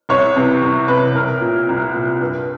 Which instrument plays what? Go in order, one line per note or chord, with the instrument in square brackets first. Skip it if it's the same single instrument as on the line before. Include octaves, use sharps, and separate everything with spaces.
[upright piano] C2 C#5
C3 E3
C2
C3 E3 B4
C2 A#4
A#2
C2
A#2
G2